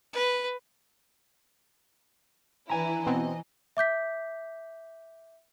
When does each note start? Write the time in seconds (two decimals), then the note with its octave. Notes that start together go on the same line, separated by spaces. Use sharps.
0.13 B4
2.69 E3 D4 E4 B4 G#5 A#5
3.07 B2 B3 C4 D#5
3.77 E5 D6 G6 B6